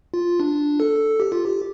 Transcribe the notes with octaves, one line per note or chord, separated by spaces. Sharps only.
F4
D4
A4
G4
F4
G4